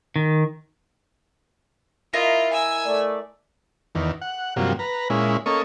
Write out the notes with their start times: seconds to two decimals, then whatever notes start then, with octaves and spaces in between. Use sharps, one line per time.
0.16 D#3
2.13 E4 F4 A#4 D#5
2.53 G#5 E6
2.85 A3 D5
3.95 E2 D#3
4.22 F#5
4.56 G2 C3 F3 F#3 A#3
4.79 B4 A#5
5.10 A#2 G#3 C#4 E4
5.46 A#3 C#4 A4 D#5 C#6